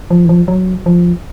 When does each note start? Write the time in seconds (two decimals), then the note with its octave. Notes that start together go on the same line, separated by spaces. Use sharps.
0.11 F3
0.25 E3
0.29 F3
0.48 F#3
0.86 F3